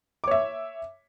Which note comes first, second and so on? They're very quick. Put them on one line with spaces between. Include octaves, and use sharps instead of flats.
D6 C#5 E5